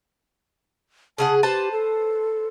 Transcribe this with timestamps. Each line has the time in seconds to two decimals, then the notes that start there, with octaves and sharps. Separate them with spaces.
1.18 C#3 G#4 F#5 A5
1.43 G4 B4 C5 A5
1.72 A4